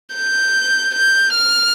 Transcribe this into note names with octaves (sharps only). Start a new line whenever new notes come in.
G6
G6
F6